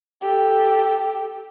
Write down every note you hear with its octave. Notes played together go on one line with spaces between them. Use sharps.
G4 A4